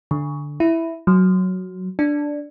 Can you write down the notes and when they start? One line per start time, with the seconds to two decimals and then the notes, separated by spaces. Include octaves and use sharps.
0.11 D3
0.60 E4
1.07 F#3
1.99 D4